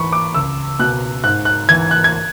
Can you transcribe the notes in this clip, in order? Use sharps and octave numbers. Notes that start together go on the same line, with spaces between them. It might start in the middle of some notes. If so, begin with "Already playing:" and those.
Already playing: G#2 E3 B5 C#6
D6
C#2 E6
B2 F#6
G#2 F#6
F#6
E3 G#6
F#6
G#6